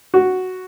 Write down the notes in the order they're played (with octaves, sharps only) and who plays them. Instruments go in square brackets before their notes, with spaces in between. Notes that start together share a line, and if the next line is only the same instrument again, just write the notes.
[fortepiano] F#4